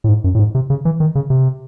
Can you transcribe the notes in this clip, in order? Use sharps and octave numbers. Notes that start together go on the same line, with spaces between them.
A2
G#2
F#2
A2
G#2
C3
C#3
E3
D#3
C#3
C3